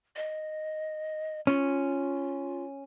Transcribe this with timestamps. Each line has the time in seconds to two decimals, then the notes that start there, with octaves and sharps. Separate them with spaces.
0.16 D#5
1.47 C#4 F4